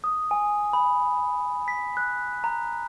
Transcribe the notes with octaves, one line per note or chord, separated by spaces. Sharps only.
D#6
G#5
B5
B6
F#6
A#5